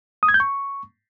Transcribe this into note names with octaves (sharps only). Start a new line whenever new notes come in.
D#6
G#6
G6
C#6